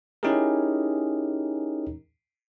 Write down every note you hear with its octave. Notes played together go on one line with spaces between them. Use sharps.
C#4 D#4 E4 G4 G#4 A#4